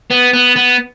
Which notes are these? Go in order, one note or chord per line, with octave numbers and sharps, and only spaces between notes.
B3
B3
B3